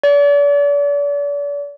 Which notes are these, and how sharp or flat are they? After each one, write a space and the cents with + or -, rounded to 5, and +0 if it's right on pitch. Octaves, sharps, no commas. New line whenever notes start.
D5 -40